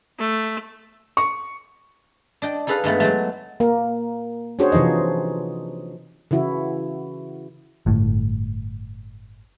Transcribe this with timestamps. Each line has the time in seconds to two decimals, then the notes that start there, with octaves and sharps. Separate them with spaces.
0.19 A3
1.17 C#6
2.42 D4 D#5 G5
2.67 D#4 G#4 A4 B4 D#5 F5
2.84 G2 G#3 A3 B3
3.00 F#3 G#3 A3
3.60 A#3 A#4
4.59 C#4 D4 F#4 G#4 C5 C#5
4.72 C3 E3 F3 D#4 D#5
6.31 C#3 E3 E4 F#4
7.86 G1 A2